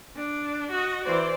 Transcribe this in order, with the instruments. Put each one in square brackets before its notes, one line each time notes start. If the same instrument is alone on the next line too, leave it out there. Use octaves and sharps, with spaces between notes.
[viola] D4
F#4 D#5
[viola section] E3 C5 [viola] D5